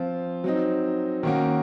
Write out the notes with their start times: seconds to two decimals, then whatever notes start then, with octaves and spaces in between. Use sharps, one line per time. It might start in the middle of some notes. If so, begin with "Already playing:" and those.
Already playing: F3 C4 F4
0.44 F#3 C4 D#4
1.23 D#3 A#3 C#4 F#4